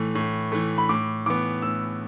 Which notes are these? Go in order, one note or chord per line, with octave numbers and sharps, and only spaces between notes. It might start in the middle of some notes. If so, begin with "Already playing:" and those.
Already playing: A2 E3 A3
A2
E3 A3
B5
A2 D6
E3 B3 D6
A2 E6